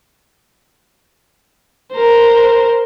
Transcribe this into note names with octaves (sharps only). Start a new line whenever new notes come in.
A#4 C5